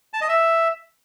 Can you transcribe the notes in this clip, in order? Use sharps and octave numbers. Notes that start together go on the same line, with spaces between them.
A5
D#5
E5